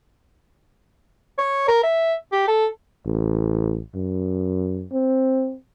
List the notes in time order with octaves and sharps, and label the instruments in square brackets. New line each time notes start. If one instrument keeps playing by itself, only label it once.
[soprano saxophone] C#5
A#4
E5
G4
A4
[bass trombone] A1
F#2
C4